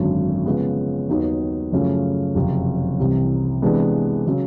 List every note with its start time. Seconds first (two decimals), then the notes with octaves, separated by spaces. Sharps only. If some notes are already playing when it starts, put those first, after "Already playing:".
Already playing: G#1 F#2 D3 F#3
0.46 C#3 F3 G#3 B3
1.09 D#2 D#3 F#3 B3 D#4
1.72 F#2 C#3 F3 A3
2.35 F#1 F2 C3
2.99 C2 C3 E3
3.62 C3 E3 G#3 B3 D4
4.26 C#3 F#3